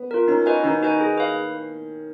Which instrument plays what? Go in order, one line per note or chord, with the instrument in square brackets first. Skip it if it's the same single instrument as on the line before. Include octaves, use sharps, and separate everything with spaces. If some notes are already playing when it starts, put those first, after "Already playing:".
Already playing: [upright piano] B3
[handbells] F4 A#4
[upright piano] C#4 [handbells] D#4
[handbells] F#4 B4 D#5 G#5
[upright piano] D#3 [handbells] D#4
[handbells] F#4 B4 D#5 G#5
G#4
B4 F5